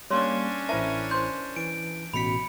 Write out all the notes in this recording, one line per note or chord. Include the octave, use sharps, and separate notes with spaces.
G3 A#3 C#4 D4 C#5 C6
A1 E4 A#4 C5 E5 A5
C5 C6 G6
E3 D7
A1 B2 B5 B6 C#7